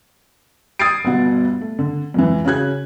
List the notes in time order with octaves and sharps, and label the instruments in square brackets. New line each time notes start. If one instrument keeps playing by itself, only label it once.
[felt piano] D#6 G#6 A6 C7 D7
G1 G2 B2 B3 F#5
A3
D3
F2 G#2 E3
C#3 C#4 F#4 F#6 G#6